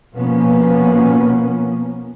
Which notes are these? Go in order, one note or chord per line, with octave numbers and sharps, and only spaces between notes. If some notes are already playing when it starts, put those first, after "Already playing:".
B2 F3 A#3 B3 C#4